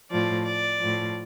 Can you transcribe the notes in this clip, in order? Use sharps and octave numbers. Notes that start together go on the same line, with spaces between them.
A2 F3 D5
D5
A2 F3